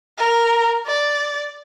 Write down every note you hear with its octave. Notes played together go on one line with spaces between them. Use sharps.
A#4
D5